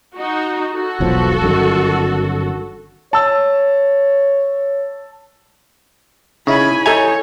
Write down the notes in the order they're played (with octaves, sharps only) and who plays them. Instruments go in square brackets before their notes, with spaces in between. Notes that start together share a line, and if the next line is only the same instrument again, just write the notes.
[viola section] D#4 F#4
F#4 A4
[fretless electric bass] E1 B1 F3
G1 F#2 D#3
[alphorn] C#5 [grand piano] A5 E6
[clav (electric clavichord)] C#3 [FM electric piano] D#4 E4 [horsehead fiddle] G#5 B5
[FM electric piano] E4 D#5 G6 [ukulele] A4 A#5 [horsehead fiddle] C#5 [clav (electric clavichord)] G#5